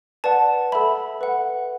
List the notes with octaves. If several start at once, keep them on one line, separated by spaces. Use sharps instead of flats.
B4 D5 F#5 A5
A4 E5 B5
B4 F#5